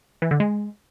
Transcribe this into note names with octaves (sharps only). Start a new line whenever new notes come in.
E3
D3
G#3